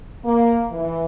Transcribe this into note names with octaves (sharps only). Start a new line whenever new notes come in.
A#3
E3